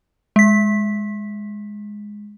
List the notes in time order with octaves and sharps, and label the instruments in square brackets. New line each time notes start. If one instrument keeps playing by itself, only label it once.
[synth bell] G#3 B6